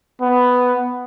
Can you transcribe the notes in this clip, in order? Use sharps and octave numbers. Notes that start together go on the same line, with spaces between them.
B3